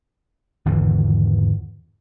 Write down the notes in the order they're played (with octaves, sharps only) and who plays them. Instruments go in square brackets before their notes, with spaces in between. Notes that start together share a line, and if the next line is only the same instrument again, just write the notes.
[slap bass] G#1 E2 D3 E3